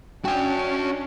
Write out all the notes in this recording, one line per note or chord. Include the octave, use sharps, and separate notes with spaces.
C#4 D4 F#4 G5 G#5